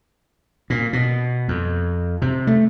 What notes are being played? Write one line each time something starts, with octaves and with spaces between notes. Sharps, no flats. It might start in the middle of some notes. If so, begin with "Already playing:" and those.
A#2
B2
F2
C3
A3